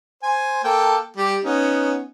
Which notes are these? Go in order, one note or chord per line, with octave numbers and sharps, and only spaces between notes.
C5 G#5
A#3 A4 G5
G3 G4
B3 C#4 D#4